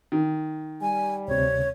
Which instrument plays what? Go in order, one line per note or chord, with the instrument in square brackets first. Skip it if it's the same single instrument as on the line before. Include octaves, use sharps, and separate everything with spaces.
[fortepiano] D#3
[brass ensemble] G3 [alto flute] G#5
[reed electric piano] D2 C3 [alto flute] C#5